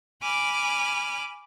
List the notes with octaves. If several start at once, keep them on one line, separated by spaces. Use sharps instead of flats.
G#5 B5 D6 F6